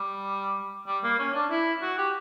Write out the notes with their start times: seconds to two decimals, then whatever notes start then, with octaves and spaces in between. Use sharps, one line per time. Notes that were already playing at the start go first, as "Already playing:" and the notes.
Already playing: G3
0.87 G3
1.04 A#3
1.19 C#4
1.34 D4
1.51 E4
1.82 F#4
1.98 G4